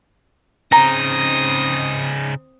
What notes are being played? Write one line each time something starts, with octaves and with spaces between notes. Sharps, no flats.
C#3 C4 D#4 A#5 D#6